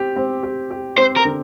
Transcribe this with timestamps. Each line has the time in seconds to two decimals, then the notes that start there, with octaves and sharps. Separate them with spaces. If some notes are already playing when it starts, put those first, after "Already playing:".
Already playing: C4 G4
0.16 C4
0.43 G4
0.71 G4
0.98 C4 C5
1.17 A#4
1.25 D3